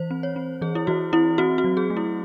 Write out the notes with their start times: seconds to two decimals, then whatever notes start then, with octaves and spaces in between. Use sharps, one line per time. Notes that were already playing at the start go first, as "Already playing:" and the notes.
Already playing: E3 C5
0.10 C4
0.23 C#5
0.36 C4
0.61 E3 G#4
0.75 E4
0.87 E3 F#4
1.13 C4 E4
1.38 C4 F#4
1.58 F#4
1.64 F#3
1.77 G#4
1.90 A3
1.97 E4